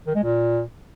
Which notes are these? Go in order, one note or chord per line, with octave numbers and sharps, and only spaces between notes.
D#3
G#3
A#2